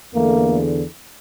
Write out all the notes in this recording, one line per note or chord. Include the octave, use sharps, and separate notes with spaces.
E2 D3 A3 A#3